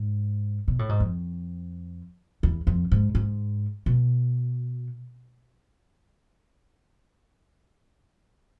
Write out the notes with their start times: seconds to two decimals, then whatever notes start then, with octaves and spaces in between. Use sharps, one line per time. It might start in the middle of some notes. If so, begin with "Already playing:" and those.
Already playing: G#2
0.68 B2
0.79 A2
0.89 G#2
1.00 F2
2.43 E2
2.67 F2
2.92 G#2
3.15 G#2
3.86 B2